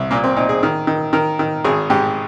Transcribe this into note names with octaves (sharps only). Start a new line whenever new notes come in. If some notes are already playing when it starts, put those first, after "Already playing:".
Already playing: C2
A#2 A#3
C4
A#2 D#4
G#4
D#3
D#3
D#3 A#4
D#3
G#1 G#4
G#2 G4